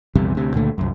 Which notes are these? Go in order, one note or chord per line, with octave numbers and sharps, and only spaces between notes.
A#1 E2 C3 G3
D2 C3
C#2 A#2 D3 A3
C2 F#2